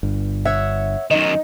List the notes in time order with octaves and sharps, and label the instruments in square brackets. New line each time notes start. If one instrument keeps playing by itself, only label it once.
[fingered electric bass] G1 G2
[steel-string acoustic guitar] C#5 E5 F#5
[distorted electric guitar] F#2 D#3 [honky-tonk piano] D#4